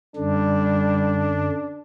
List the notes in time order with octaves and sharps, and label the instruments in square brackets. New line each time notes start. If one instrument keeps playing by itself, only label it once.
[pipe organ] F#2 D3 [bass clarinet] G3 [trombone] D4